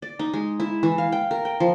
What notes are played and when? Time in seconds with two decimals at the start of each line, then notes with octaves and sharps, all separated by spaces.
0.02 D5
0.19 D#4
0.34 G#3
0.60 E4
0.83 E3
0.98 F5
1.12 G5
1.31 A#4
1.45 G5
1.60 F3